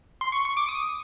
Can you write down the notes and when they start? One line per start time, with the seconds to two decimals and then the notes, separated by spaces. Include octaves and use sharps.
0.21 C6
0.32 C#6
0.45 C#6
0.57 D6
0.68 D#6